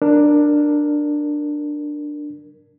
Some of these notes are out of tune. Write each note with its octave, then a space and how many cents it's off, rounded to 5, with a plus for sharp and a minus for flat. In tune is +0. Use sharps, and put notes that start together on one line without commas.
D4 +10 A#4 +0